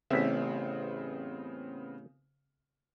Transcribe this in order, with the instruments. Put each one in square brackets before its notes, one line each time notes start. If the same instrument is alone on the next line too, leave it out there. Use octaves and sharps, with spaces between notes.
[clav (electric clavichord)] A1 E5 [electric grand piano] C#3 B3 C4